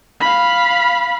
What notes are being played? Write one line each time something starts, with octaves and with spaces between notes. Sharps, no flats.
F5 B5